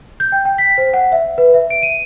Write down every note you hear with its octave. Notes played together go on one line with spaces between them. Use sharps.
G6
G5
G5
B6
C5
F#5
E5
B4
E5
D7
D#7